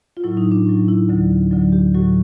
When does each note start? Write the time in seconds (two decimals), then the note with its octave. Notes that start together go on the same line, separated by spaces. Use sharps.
0.17 F4
0.24 A2 F#3 E4
0.37 D#4
0.52 D4
0.66 A2 F#3
0.88 E4
1.09 D2 D3 F#3
1.51 D2 D3 F#3
1.72 G4
1.94 A2 F#3 F#4